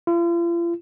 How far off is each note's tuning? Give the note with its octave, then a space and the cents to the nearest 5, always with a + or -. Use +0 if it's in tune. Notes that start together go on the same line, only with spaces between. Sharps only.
F4 -40